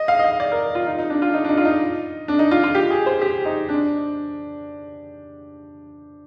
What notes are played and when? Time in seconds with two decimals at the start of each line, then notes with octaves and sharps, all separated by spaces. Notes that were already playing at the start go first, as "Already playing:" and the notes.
Already playing: D#5
0.08 F5
0.19 D#5
0.24 F5
0.40 D5
0.52 A#4
0.75 F4
0.87 D#4
0.99 D#4
1.10 D4
1.22 F4
1.34 D#4
1.44 D4
1.49 D#4
1.57 F4
1.65 D#4
2.28 D4
2.39 D#4
2.51 F4
2.63 F4
2.75 G4
2.90 G#4
3.06 C5
3.22 G4
3.45 D#4
3.69 D4